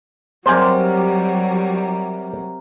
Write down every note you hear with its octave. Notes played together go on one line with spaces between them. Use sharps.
C3 F#3 G3 A#4 C5 D5 G#5